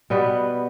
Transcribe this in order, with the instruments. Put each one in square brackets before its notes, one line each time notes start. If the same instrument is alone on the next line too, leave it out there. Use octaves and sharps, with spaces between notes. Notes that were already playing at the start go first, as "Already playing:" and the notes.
[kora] B2 G3 B3 F#4